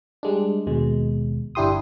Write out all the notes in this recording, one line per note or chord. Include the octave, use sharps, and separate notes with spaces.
G3 G#3 D4
D#2 B2 G#3
G1 D4 E4 G4 C6 D#6